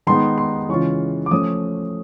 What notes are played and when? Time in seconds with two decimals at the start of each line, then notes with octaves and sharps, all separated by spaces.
0.07 D#3 G#3 B3 D#4 C6
0.38 C6
0.69 C#3 E3 G#3 C#4 F4 C#6
1.26 D6
1.31 F3 A3 C#4 D#6